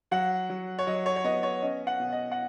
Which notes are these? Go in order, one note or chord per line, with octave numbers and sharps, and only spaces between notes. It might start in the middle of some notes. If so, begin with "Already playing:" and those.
F#3 F#5
F#3
C#5
F#3 D#5
C#5
C#5
B3 D#5
C#5
C#4 D#5
F#5
B2
D#5
F#5